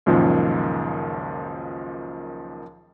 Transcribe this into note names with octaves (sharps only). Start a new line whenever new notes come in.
C#2 F#2 A#2 D#3 F3